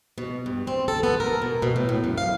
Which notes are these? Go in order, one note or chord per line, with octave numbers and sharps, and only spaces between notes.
B2
G2
C4
A4
B3
A#4
B2
B2
A2
A2
F#2
F5